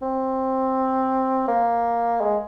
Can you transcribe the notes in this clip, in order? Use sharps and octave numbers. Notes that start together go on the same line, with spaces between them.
C4
A#3
G#3